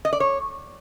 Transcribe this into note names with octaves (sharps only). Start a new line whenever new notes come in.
D#5
D5
C#5